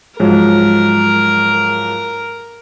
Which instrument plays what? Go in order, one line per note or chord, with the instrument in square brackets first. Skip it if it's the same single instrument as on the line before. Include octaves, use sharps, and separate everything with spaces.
[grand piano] G#2 F3 F#3 [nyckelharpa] A#4